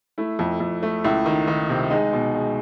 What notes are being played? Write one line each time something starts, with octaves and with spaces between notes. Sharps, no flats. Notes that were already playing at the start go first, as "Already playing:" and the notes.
A3 E4
F2
F2
A3
C#2 E4
D#3
D#3
C3
G#3 D#4
B2
G#3